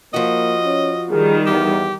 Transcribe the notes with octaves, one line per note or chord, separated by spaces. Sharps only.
F3 A#3 F#4 D#5
C#4
D#3 G3 G#4
E2 G4